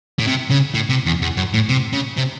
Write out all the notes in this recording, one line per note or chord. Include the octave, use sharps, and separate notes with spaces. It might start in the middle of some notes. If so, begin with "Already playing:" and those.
A2
C3
C#3
A2
C3
E2
E2
F#2
A2
C3
C#3
C3